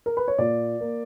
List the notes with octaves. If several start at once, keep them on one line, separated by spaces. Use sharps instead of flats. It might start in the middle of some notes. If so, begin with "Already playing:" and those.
A#4
B4
C#5
A#2 D5
A#3